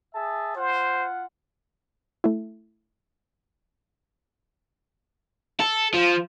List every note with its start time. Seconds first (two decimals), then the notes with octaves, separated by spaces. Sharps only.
0.15 G#4 E5 A5
0.56 F4 C5 F#5
2.24 A3 E4
5.60 A4
5.94 F3